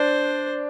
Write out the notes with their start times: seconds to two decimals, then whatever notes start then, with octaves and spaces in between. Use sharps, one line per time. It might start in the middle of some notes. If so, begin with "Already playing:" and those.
Already playing: D4 C5